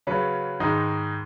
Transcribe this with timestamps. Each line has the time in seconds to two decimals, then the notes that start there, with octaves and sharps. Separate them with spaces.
0.07 C#3 F#3 C#4 B4
0.60 G#2 D#3 G#3 D#4